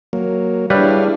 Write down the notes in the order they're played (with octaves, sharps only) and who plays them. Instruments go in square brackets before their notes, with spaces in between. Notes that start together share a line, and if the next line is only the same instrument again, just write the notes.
[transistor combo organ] F#3 A#3
[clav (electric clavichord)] G3 B4 [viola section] D4 E4 G#4 [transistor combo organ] C#5 F5